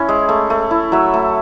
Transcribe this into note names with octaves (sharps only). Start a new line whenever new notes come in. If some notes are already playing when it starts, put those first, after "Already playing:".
Already playing: C#4 E4
G#3
A3
A3
E4
F#3 E5
A3